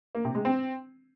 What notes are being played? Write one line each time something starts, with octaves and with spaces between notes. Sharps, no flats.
A#3
C3
G#3
C4